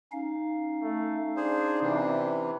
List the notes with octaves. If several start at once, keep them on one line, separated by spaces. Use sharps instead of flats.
C#4 D#4 F5
A3
D4 G#4 C5
C3 E3